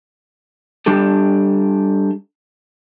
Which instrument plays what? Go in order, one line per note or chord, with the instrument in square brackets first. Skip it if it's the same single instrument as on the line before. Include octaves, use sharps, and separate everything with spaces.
[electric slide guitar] G3 D4 G4 A4